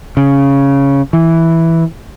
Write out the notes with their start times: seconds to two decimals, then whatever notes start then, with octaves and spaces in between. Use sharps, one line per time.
0.17 C#3
1.13 E3